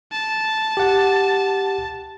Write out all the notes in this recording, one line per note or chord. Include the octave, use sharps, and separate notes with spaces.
A5
G4 F#5